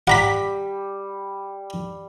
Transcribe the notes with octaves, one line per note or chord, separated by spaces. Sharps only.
G3 F#5 A#5 B5